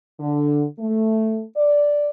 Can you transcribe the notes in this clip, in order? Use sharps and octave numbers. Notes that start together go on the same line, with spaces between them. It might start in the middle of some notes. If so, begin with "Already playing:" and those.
D3
A3
D5